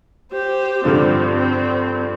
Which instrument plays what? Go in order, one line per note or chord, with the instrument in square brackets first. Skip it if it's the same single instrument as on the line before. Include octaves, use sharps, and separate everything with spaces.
[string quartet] G4 C5
[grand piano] G2 D3 F3 D4 [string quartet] C4
[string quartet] C4